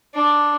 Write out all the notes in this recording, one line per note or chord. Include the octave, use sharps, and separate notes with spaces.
D4